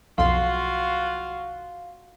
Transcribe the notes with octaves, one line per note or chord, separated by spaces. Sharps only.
B1 F2 F4 F#4 F5 C6